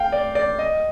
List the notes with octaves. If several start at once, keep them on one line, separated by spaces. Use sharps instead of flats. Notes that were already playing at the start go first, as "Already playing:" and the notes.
Already playing: F5 G5
D5
D5
D#5